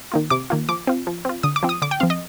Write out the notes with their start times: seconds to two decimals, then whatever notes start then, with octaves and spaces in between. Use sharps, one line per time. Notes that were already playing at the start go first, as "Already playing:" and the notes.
0.12 D#3 A#3 F4
0.30 C3 D6
0.50 D#3 A#3 F4
0.69 F3 D6
0.87 C4 F4
1.07 F3
1.25 C4 F4
1.43 D3 D#6
1.56 D6
1.63 F3 C4
1.69 D#6
1.82 D3 D6
1.91 G5
2.00 F3 C4 F5
2.10 D#5